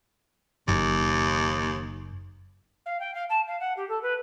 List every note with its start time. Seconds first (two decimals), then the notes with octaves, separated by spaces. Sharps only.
0.68 F#1 D#2
2.86 F5
3.00 G5
3.14 F5
3.29 A5
3.47 F5
3.60 F#5
3.77 G4
3.89 A4
4.02 B4